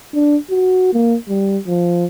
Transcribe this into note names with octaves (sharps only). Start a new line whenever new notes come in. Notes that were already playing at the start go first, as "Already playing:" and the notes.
D4
F#4
A#3
G3
F3